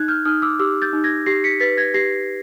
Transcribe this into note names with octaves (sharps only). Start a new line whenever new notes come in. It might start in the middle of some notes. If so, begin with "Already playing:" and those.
Already playing: D#4 F#6 G#6
F6 G6
D#4 D#6 F6
D6 E6
G4 D6 E6
G6 A6
D#4
G#6 A#6
G4 A#6 C7
B6 C#7
B4 A6 B6
G#6 A#6
G4 A#6 C7